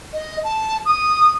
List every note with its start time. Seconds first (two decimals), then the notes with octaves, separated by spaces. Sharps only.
0.13 D#5
0.44 A5
0.85 D#6